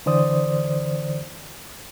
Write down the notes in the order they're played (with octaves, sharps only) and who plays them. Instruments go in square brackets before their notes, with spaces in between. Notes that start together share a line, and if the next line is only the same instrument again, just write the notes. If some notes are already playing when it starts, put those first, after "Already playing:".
[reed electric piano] D3 E3 C5 D5 D#6